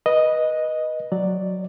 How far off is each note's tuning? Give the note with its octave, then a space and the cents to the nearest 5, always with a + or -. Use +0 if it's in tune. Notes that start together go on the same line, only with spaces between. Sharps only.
B4 -15 D#5 +0
F#3 +0 D5 +0